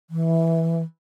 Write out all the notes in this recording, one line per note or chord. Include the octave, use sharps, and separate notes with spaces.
E3